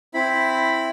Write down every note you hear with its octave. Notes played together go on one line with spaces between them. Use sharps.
C4 E4 B5